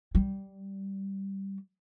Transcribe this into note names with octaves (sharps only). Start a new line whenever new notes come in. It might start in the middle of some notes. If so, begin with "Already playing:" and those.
G3